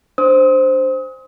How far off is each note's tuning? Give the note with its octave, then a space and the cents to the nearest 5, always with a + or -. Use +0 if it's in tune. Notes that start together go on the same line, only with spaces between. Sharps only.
D4 +0 C5 +0 D#6 +35